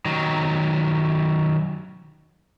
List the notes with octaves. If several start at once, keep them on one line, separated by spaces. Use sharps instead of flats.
D#3 F#3